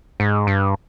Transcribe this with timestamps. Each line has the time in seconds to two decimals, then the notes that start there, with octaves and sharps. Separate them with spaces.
0.20 G#2
0.47 G2